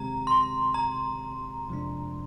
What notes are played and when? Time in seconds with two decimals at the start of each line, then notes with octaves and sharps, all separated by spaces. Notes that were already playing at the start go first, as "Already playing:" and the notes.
Already playing: C3 D#3 G#3 C4 G4 A#5
0.27 C6
0.74 A#5
1.68 F2 C3 F3 G#3 D4